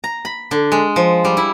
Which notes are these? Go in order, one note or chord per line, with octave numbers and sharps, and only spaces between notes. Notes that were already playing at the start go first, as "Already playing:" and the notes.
A#5
B5
D3
G#3
F3
G3
E4